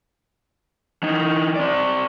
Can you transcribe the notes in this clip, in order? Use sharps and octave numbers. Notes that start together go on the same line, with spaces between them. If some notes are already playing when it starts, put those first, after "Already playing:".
E3 D#4
C4 D5